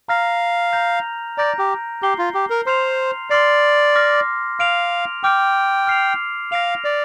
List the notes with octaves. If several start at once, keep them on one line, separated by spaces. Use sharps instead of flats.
F5 A#5 F6 A#6
A#5 G6 A#6 F7
D5 A#5 G6 A#6 D7
G4
G4 G6 C7 G7
F4
G4
A#4
C5 C6 F6 C7 F7
D5 C6 F6 C7
D6 F6 A#6
F5 F6 D7 F7
G5 D6 F6 D7
F6 C7 F7
F5 F6 A#6 D7 F7
D5